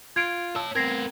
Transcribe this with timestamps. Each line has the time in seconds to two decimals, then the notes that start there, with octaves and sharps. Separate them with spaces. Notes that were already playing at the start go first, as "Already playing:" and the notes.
0.16 F4 G#6 D7
0.56 C#5 A5 E6
0.75 B3 C4 A#4 G#6 A#6 C7